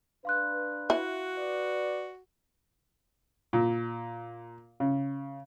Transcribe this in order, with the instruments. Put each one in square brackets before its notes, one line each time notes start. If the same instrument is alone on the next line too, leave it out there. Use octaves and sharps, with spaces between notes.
[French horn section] D4 B4 [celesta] F5 C6 F#6
[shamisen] E4 [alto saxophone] F#4
[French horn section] B4 D5
[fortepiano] A#2
C#3